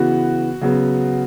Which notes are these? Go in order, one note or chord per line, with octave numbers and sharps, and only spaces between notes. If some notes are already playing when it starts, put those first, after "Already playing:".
Already playing: C#3 E3 B3 F#4
C#3 F#3 B3